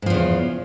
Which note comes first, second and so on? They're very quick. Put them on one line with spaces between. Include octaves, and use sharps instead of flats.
G#2 F3 E2 C#3